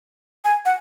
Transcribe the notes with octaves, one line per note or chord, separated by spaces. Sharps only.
G#5
F#5